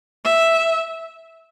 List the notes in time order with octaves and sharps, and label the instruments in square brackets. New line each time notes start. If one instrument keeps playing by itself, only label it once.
[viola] E5